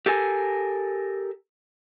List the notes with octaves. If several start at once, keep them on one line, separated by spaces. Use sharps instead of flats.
G4 A4 A#4 G#5